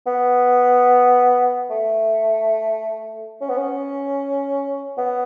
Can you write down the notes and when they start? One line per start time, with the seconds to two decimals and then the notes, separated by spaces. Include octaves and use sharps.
0.07 B3
1.70 A3
3.41 C#4
3.49 B3
3.57 C#4
4.98 B3